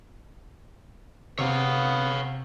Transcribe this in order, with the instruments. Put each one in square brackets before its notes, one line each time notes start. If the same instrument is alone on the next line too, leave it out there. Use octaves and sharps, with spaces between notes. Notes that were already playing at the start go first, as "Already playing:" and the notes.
[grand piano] C3 [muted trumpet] B3 [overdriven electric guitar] C#5 F5